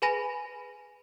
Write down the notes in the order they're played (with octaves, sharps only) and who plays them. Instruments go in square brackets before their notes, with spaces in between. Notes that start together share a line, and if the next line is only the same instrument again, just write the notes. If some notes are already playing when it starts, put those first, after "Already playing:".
[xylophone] G#4 B4 G#5 B5 A#6 D#7